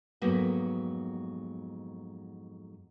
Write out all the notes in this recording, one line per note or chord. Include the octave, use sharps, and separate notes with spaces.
F2 G#2 F#3 A#3 B3